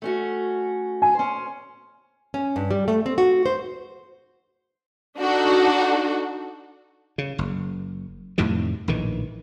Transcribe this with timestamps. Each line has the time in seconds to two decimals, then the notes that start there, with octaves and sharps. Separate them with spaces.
0.02 A3 C#4 F#4
1.02 G#5
1.15 C#4 C5
2.34 C#4
2.56 G2
2.71 G3
2.88 A3
3.06 C4
3.18 F#4
3.46 C5
5.18 D4 D#4 F#4 A4
7.18 C#3
7.39 F#1
8.38 F2 A2 C3 D#3
8.88 A#1 A2 D#3 E3